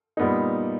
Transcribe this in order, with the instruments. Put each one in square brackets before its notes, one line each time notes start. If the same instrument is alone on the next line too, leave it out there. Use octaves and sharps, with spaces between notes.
[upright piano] A#2 G3 B3 D#4